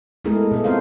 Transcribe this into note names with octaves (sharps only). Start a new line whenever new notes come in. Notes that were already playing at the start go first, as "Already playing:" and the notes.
G#3 A3 B3 E4 G#4 A#4
B2 B3 A4
C4 F4 A#4 C5 F5